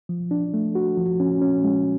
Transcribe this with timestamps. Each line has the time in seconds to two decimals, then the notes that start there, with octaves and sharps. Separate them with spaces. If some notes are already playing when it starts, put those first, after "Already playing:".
0.09 F3
0.31 D4
0.54 A3
0.75 F#4
0.97 F3
1.20 C#4
1.42 C#4
1.64 G#3